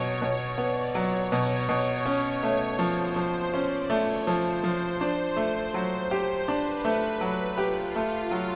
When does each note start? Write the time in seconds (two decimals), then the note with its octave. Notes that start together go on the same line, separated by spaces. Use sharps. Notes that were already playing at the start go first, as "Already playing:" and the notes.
Already playing: B2 F#3 C#5
0.22 B2
0.58 B3 D5
0.95 F#3 C#5
1.32 B2
1.69 B2
2.05 C#4 C#5
2.43 A3
2.79 F3 C5
3.16 F3
3.53 C#4 D5
3.90 A3 C#5
4.27 F3 C5
4.64 F3
5.01 D4
5.37 A3
5.74 F#3
6.11 G4
6.48 D4 B4
6.85 A3
7.21 F#3 B4
7.58 F4 G4
7.96 A3
8.31 F#3